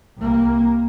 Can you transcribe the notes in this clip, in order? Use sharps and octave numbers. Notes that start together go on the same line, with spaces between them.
C2 A#3